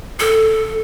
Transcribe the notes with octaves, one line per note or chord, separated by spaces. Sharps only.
A4